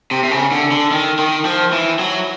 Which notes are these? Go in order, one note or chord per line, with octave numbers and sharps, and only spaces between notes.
C3
C3
C#3
D3
D3
D#3
D#3
F3
E3
F#3